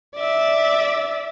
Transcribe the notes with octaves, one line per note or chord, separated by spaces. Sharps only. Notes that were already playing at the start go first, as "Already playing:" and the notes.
D5 E5